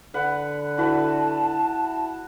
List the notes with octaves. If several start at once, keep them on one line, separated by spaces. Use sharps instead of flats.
D3 B4 F#5
E4 F#4 B4 A5